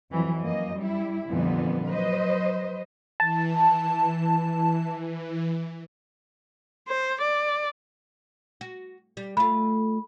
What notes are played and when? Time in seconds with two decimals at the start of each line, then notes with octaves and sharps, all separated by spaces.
0.11 F2 E3 F#3
0.43 F#2 A#3 D#5
0.78 G3 E4
1.28 F2 A#2 D3 E3 G3 B3
1.88 F#3 B4 C5 D#5
3.20 E3 A5
6.88 C5
7.21 D5
8.61 F#4
9.17 G3
9.37 A3 F4 B5